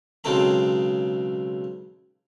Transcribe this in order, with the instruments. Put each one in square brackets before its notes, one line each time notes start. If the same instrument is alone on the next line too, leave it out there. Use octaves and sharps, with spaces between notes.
[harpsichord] B1 C#3 G#3 C4 A4 A#5